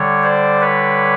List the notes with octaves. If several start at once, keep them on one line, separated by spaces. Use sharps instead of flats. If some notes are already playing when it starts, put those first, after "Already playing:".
Already playing: D3 G3 C#5
C5 D5
B4 C#5